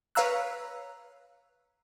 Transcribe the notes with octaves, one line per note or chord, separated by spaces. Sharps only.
B4 C#5 F5 A#5 E6 F#6